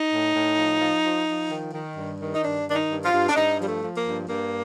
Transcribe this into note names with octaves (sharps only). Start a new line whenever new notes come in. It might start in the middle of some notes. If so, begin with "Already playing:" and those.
Already playing: D#4
A2
A2
F3
F3
F3
F3
D#3
D#3
G2
D#3
D#4
G2 D4
D#3 D4
D#4
G2
F4
G2
D4
G2 D#4
F3 G3
A3
F3
A#3
G2
G2 A#3